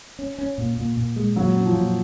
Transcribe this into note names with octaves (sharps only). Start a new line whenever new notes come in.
C#4
C#4
A#2
A#2
A#2
G#3
A#2 F#3
C#4
F3
A#2